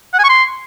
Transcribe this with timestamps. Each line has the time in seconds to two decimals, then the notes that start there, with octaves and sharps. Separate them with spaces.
0.14 F#5
0.19 G#5
0.24 C#6
0.29 C6